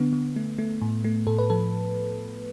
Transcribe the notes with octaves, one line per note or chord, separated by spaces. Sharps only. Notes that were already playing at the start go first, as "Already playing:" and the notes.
Already playing: D3 B3
D3
A3
A3
A2
A3
A2 A4
B4
F3 A4